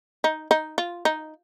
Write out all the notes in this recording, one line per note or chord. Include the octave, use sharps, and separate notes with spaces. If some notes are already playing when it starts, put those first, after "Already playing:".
D#4
D#4
F4
D#4